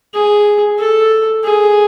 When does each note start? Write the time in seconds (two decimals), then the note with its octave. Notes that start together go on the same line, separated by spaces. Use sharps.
0.14 G#4
0.79 A4
1.44 G#4